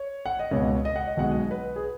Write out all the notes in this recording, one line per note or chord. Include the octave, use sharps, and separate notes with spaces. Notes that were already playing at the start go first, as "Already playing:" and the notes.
Already playing: C#5
F#5
D#5
C#2 B2 G#3 C#5
D#5
F#5
D#5
B1 B2 G#3 F#5
D#5
B4
G#4